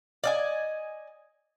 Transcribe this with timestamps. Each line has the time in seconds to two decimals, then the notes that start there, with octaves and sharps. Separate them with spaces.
0.24 D5 D#5 G#5